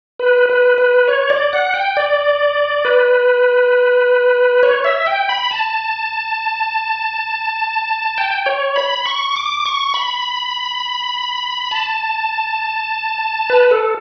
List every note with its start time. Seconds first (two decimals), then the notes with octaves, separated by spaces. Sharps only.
0.19 B4
0.50 B4
0.78 B4
1.08 C#5
1.30 D5
1.53 F#5
1.74 G5
1.97 D5
2.85 B4
4.63 C#5
4.84 E5
5.06 G5
5.29 B5
5.51 A5
8.18 G5
8.46 C#5
8.76 B5
9.06 C#6
9.36 D6
9.66 C#6
9.94 B5
11.71 A5
13.50 B4
13.71 A4